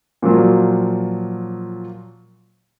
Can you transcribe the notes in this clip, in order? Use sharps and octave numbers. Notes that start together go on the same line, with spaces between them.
A#2 F3 F#3